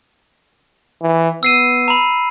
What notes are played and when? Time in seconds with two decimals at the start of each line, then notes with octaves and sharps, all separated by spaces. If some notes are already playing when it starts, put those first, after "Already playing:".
1.02 E3
1.43 B3 E6 C7 D#7
1.88 A#5 B5